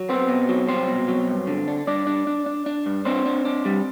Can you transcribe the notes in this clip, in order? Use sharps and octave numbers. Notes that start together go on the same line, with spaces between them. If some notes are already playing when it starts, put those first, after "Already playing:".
Already playing: F#3
B3 C4 C5
B2
F#3
C2 C4 C5
B2
F#3
G2
D3
D4
G2 D4 D5
D4
D4
D4
D4
G2
C4 D4 C5
D4
D4
G3